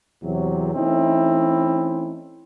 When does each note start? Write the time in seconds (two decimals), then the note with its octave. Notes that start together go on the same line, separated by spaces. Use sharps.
0.23 E2 C3 F#3
0.75 E3 A3 C4 C#4 D#4 E4